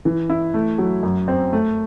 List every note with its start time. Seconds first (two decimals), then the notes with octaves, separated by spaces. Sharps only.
0.05 E3
0.30 E4
0.54 A3
0.78 F#3
1.03 F#2
1.28 C4
1.53 A3